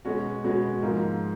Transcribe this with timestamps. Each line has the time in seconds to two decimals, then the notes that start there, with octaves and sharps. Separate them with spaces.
0.05 B2 G#3 C#4 F#4
0.44 B2 G#3 C#4 F#4
0.83 G#2 F3 A#3